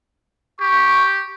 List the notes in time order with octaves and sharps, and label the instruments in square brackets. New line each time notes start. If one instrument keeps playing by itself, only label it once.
[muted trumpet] G4 [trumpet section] C#6